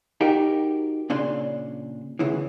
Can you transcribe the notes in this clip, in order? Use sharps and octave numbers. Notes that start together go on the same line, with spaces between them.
D#4 F#4 G4 A#4
A#2 C#3 D4 C6
D2 C#3 E3